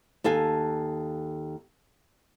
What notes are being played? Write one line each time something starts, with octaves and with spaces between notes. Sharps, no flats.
D#2 A4 F5 G#5